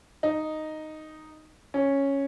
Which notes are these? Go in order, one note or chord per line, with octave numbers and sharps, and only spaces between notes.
D#4
C#4